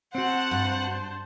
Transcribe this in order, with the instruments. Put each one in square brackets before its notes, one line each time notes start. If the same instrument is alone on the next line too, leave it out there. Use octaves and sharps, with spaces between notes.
[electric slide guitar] C4 F#4 [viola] C5 A5 [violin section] F#5
[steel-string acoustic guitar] G2